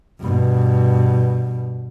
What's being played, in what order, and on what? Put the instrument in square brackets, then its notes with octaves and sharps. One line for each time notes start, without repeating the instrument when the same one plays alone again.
[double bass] G2 B2